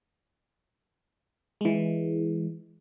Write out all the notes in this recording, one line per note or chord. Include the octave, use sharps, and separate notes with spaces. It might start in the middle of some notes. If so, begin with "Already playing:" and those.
E3 G#3